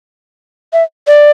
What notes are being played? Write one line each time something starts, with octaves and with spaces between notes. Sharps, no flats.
E5
D5